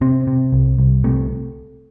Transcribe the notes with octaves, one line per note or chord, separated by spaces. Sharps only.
C3 C4
C3
C2
C2
C3 A3